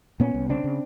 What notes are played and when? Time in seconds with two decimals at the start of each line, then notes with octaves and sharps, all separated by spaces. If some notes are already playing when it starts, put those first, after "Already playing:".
0.20 A#2 B3 C#4
0.34 C2
0.49 C#3 C4 D4
0.64 C#3